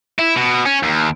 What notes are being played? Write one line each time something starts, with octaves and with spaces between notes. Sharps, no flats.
E4
B2
C#4
D#2